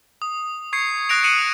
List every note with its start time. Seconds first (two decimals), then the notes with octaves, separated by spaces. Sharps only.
0.22 D#6
0.73 C#6 G#6 C7 C#7
1.09 D#6 F#6 A#6 D7 F7
1.23 D#6 F#6 C#7 D#7 E7 F#7